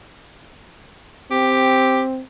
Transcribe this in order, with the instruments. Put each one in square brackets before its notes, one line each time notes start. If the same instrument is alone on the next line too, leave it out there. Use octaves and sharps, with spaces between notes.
[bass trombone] C4 [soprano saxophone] G4